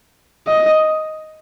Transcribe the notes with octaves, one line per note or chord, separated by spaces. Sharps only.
D#5